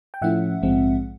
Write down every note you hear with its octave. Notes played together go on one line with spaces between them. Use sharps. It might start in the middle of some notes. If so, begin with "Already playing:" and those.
G5
A2 F3 A3 C#4 E4 E5 F#5
A#1 G#2 F3 G#3 C4